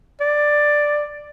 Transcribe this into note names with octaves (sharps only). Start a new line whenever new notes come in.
D5